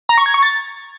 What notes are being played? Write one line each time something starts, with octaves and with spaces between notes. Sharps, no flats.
A#5
C#6
G#6
C#6
A6